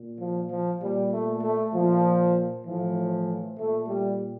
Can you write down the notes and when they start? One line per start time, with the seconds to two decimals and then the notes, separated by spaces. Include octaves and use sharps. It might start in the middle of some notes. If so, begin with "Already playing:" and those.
Already playing: A#2
0.19 F3
0.49 F3
0.81 A#2 G3
1.11 A3
1.42 A3
1.72 A#2 F3
2.65 A2 E3 F3
3.58 A#2 A3
3.88 G3